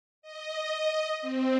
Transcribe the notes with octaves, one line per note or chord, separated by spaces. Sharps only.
D#5
C4